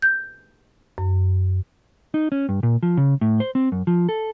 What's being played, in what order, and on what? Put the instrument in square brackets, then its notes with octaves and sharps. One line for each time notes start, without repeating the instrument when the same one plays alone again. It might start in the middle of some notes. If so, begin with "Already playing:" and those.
[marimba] G6
F#2
[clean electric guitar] D#4
C#4
G2
A#2
F3
C#3
A2
C5
C4
F#2
F3
A4